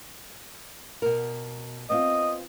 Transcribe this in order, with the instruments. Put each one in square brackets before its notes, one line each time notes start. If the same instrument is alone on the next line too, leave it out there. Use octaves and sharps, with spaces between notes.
[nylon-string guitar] B2 A#4
[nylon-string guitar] B3 C4 F4 [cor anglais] D#5